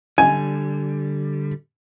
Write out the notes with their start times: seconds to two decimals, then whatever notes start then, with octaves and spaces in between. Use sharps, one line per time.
0.18 D3 G3 G#5